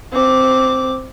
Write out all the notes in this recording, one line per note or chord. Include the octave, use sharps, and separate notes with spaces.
C4 D6